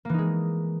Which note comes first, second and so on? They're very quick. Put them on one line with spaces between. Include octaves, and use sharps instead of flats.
A#3 E3 D#4 G#3